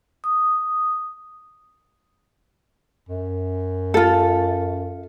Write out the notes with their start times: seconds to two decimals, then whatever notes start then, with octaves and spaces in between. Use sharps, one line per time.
0.24 D#6
3.09 F#2
3.94 F4 A4